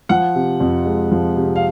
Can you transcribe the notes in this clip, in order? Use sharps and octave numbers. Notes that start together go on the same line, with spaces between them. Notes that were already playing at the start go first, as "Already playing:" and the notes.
F3 F#5
C3
F2
G#3
F3
C3
F5